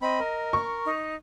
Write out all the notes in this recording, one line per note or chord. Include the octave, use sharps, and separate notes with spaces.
C4 D#5 B5
A#4
C#6
D#4